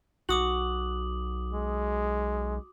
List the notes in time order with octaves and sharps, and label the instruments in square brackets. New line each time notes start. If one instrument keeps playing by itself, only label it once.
[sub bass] B1 [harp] F#4 [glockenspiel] D6 D#6 F#7
[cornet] G#3